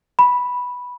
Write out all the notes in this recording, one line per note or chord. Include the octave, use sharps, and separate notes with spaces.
B5